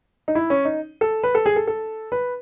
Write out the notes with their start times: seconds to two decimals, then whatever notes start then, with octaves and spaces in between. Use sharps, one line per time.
0.28 D#4
0.35 E4
0.50 C#4
0.65 D#4
1.01 A4
1.24 B4
1.35 A4
1.46 G#4
1.56 A4
1.67 A4
2.12 B4